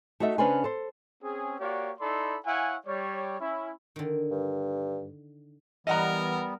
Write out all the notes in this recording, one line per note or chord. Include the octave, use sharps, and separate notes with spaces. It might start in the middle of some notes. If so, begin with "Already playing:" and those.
A3 D#4 F#4 A4 E5
C#3 C#4 D4 B4 C5 G#5
A4 C5
C4 C#4 G#4
A#3 F#4 G4 C#5 D5
D#4 E4 A4 D5 B5 C6
E4 C#5 F5 F#5 G#5
G3 C#5 D5
C#4 E4
D3 D#3
G2
E3 G3 B3 A#4 D#5 F#5 A#5